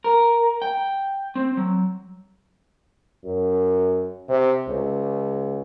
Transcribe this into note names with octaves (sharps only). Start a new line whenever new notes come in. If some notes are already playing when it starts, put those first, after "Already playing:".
A#4
G5
C4
F#3
F#2
C3
C#2